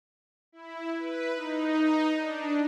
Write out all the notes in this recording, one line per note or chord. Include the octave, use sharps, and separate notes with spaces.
E4
B4
D#4
D4